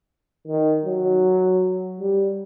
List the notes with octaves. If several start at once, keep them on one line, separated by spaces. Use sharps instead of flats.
D#3
F#3
G3